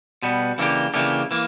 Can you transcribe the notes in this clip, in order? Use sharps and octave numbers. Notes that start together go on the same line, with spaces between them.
B2 G3 B3
C#3 E3 A#3 D4 G4
C#3 E3 A#3 D4 G4
E3 A#3